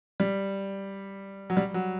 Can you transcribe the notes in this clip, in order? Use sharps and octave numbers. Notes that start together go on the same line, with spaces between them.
G3
F#3
G3
F#3